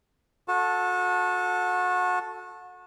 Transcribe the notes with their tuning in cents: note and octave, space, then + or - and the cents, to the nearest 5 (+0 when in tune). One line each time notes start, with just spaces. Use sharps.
F#4 -30 A4 -5 A5 +0